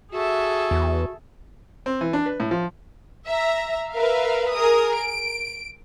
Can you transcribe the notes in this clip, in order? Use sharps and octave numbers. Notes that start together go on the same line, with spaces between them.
F#4 G#4 A4 E5
E2
C4
E3
D4
B4
A2
F3
E5 A#5
A#4 B4 E5 F5
G#4 A#4 D#6
D7